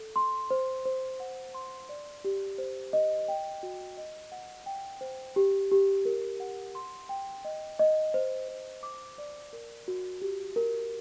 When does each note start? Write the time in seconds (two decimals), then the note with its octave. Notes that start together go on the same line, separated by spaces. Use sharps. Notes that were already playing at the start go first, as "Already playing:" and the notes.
Already playing: A4
0.16 C6
0.51 C5
0.85 C5
1.20 F#5
1.54 C6
1.89 D5
2.24 G4
2.58 C5
2.93 D#5
3.28 G5
3.63 F#4
3.97 D#5
4.32 F#5
4.66 G5
5.01 C5
5.36 G4
5.71 G4
6.05 A#4
6.40 F#5
6.75 C6
7.09 G5
7.45 D#5
7.79 D#5
8.14 C5
8.48 C5
8.83 D6
9.18 D5
9.53 A#4
9.88 F#4
10.22 G4
10.56 A#4